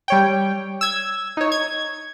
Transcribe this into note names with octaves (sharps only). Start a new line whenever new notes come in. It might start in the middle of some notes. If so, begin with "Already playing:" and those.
G3 C#5 G5
E6 G#6
D#4 C#5
G#6